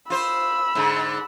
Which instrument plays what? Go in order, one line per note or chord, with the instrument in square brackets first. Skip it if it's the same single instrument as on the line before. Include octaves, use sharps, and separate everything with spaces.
[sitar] F4 C5 [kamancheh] B5 E6
[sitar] G#2 D3